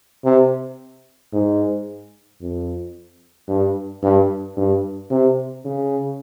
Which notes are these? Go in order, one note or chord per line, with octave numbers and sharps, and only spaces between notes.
C3
G#2
F2
G2
G2
G2
C3
C#3